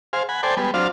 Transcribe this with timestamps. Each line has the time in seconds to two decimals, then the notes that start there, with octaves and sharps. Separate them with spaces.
0.13 G#4 C5 F5
0.29 F#5 G#5 B5
0.43 A4 C5 D5 G5 G#5
0.57 G3 G#3 B3
0.74 F#3 C4 D4 F4 F5